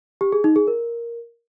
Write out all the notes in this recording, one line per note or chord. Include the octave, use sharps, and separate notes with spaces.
G4
G#4
D#4
G#4
A#4